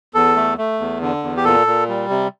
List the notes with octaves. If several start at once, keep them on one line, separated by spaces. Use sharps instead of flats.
E2 A4
A3
A3
E2
D3
E2
G4
A#2 A4
A#2
G3
C3